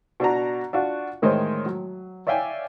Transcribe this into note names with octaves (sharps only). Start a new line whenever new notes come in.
B2 D4 F#4 A#5
D4 F4 F#4
A1 D#3 G#3 C5 C#5 D#5
F#3
C#5 D5 E5 F5 G5 G#5